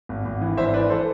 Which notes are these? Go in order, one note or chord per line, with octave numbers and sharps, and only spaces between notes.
G#1
G#1
E3
G#1 C5 E5
E3 B4 D5
A4 C5